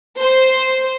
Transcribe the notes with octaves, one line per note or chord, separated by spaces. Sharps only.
C5